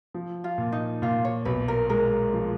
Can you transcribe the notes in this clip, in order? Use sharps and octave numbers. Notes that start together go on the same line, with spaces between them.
F3
F4
A#2
D#4
A#2 F4
C#5
B1 B4
A#4
G#3 A#4
F3